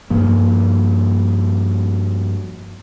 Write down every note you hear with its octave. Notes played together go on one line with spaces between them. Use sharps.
G2 F3 A#3